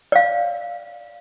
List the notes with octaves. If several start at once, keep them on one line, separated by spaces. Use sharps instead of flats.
D5 F5